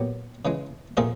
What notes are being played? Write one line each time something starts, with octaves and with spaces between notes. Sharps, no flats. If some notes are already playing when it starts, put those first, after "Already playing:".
Already playing: A#2 F#3 B3 G4
C#3 E3 G#3
A#2 F3 A3 C4 G#4 A#4